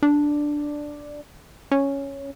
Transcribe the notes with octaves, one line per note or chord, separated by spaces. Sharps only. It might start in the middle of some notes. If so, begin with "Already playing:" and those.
D4
C#4